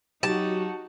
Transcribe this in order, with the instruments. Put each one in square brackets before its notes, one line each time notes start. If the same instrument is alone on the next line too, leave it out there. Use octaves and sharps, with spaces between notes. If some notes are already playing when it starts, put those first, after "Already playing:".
[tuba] F#3 [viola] D#4 F#4 [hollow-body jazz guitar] G4 [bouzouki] A5